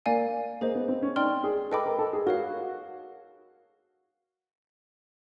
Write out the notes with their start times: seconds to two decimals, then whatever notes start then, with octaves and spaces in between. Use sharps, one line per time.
0.06 A#3 D5 F5 G#5
0.61 A#3 G#4 C5 D#5
0.75 B3
0.88 C4
1.02 C#4
1.16 D#4 D5 G5 C6 F6
1.44 G#4
1.72 A4 B4 D#5 G5 B5 D6
1.86 A#4
1.99 A4
2.13 G#4
2.26 F#4 A#4 C#5 F5